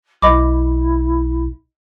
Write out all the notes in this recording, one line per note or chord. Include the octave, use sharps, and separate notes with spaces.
B1 E4 D#5 B5 D6